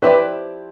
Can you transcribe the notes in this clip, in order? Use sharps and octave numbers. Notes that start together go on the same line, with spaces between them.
F3 C4 E4 G4 B4 D5